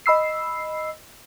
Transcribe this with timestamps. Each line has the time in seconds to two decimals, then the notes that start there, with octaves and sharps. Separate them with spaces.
0.06 D#5 B5 E6 C7